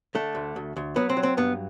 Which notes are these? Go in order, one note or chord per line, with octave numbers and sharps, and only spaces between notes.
D3 A3
D2
D2
D2
F#3 B3
C4
F#3
C4
G2 B3